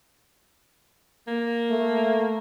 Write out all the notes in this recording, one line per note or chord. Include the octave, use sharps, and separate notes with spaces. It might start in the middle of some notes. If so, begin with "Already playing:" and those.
A#3
A3